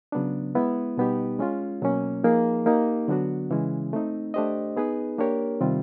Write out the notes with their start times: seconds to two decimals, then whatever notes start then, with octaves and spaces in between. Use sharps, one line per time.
0.12 C#3 F#3 B3 D4
0.55 G#3 B3 E4
0.97 B2 G3 B3 D#4 G4
1.39 G#3 C#4 F4
1.82 B2 F#3 A#3 C#4
2.24 F3 A#3 D#4 G#4
2.66 A#3 D#4 G4
3.08 D3 F#3 B3 D4 F#4
3.51 C#3 E3 G#3 C#4 E4
3.93 A3 C4 D#4
4.34 A3 D4 G4 C5 D#5
4.76 B3 D#4 G#4 B4
5.18 A#3 D4 G4 A#4 C#5
5.61 C3 D#3 G3 C4 F4